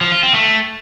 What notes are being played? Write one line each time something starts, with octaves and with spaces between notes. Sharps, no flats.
F3
F4
C4
A3